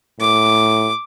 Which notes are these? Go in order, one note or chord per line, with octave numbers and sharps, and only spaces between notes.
A2 D6